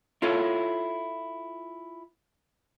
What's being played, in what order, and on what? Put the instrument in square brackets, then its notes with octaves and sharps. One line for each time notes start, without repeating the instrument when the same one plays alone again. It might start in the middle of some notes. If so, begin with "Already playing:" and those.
[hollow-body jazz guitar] E4 F4 A4 C#5